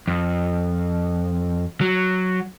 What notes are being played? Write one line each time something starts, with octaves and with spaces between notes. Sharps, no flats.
F2
F#3